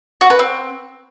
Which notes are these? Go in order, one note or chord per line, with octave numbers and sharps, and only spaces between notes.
F#4
B4
C4